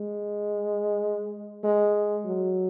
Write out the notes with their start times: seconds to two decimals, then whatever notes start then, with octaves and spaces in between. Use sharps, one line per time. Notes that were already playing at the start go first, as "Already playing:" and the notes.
Already playing: G#3
1.64 G#3
2.25 F#3